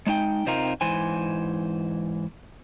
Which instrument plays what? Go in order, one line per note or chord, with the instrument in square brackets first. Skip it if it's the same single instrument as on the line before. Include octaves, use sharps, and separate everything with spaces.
[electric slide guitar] G#3 D4 D#4 G5
C3 C4 D#4 F4 A#4
G#2 E3 C5 G#5